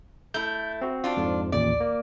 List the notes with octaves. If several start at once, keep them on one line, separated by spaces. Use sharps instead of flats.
A3 E4 G6
C4 F#4
D4 F4
F2 G#2 F3
A1 D#2 A#2 D5
A#3